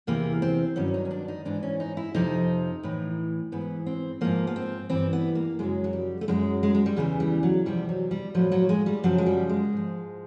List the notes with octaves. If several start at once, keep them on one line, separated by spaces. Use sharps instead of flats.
E2 C3 E3 A#3
C4
G2 D#3 F#3 C#4
D#4
C#4
D4
D#4
G#2 E3 D4
C#4
D#4
E4
F2 C3 F3 D#4
A2 E3
G#2 E3 B3
C4
G#2 F3 A#3
B3
C4
G2 E3 C4
B3
A#3
F#2 C#3 F#3 G#3
F#3
G3
A3
F#2 D#3 F#3 G#3
G#3
G#3
G3
E2 C#3 E3 F#3
G3
F#3
E2 C3 F3 G3
F#3
G3
A2 F3 F#3
F#3
G#3
G3
F#2 C#3 F3 F#3
G#3
G3
G#3
G#2 F3